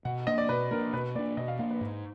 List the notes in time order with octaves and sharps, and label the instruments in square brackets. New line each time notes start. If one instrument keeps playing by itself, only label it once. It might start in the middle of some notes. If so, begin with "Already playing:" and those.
[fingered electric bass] B2 [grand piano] F#5
[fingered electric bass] A#3 D4 [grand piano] D#5
[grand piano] D5
[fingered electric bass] B2 [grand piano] B4
[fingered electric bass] A#3 D4 [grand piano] A#4
[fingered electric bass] B2 [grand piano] B4
[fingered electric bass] A#3 [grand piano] D5
[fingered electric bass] D4
[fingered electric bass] B2 [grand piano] D#5
[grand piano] F5
[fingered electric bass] A#3 D4 [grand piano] F5
[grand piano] B4
[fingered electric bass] G#2